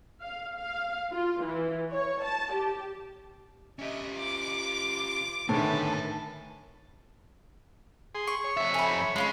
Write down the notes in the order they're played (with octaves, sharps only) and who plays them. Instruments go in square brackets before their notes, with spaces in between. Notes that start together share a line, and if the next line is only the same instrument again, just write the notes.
[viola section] F5
F5
F4
E3
C#5
A5
G4
[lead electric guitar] C#4 G4 [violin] D#5 E5
[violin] F4 D6
[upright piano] A2 D3 D#3 [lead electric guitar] A#4 G#5 [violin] B4 E5 [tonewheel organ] A5
[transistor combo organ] G#4 C6
[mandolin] C#6
[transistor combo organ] C#5
[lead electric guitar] F2 E5
[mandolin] G#5 B5
[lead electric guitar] G#3 [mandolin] C#4 F4 B5